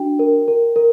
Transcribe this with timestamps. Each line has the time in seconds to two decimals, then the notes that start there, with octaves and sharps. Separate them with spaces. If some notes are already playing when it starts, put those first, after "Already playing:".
Already playing: D4 F#4 G5
0.19 A#4
0.48 A#4
0.76 A#4